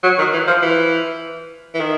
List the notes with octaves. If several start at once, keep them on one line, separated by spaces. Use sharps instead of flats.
F#3
D#3
E3
F3
E3
E3
D#3